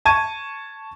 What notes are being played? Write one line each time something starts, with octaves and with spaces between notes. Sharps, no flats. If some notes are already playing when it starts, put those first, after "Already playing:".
A5 C#6 G#6 D#7